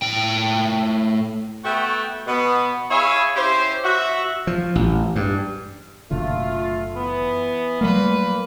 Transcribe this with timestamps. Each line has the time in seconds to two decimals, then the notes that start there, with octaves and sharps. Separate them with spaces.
0.02 A2 G5
1.65 A3 B3 F#4 G5
2.27 B2 B3
2.91 E4 G#4 C#5 E5 F5 G#5
3.36 C#4 E4 G4 C5
3.84 F#4 E5
4.47 F3
4.75 A1
5.16 G2
6.11 F#1 B2 D3 A3 F4
6.95 E3 B3
7.81 A#2 F#3 G3 A3 A#3 B4